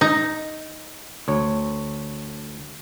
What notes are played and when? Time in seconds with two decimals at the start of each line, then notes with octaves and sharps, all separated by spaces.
0.01 D#4
1.28 D2 C#5